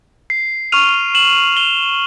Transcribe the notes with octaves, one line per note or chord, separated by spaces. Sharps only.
C7
C#6 F6 D#7 F7
E7 F#7
F7 G7